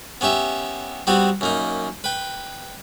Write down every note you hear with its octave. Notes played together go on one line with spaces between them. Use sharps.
B3 C#4 G4 E5
G3 B3 C4 F#4
F#2 A#3 D#4
B4 G5